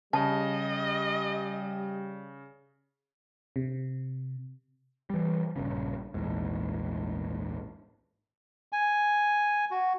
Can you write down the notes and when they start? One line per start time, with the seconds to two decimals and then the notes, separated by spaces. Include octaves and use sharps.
0.13 C#3 G3 D#5 A5
3.56 C3
5.10 E3 G3
5.56 A#1 G2 C#3
6.14 A#1 E2 G#2
8.72 G#5
9.71 F#4